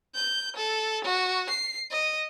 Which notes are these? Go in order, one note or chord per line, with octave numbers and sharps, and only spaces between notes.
G6
A4
F#4
C7
D#5